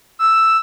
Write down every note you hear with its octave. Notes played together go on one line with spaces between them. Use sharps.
E6